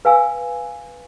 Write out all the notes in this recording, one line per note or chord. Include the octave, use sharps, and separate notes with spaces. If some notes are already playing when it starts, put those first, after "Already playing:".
B4 F5 G#5 E6